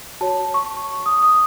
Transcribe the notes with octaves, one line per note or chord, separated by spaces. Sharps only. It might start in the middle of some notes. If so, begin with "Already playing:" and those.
F#4 C#5 A5
C#6
D#6
D#6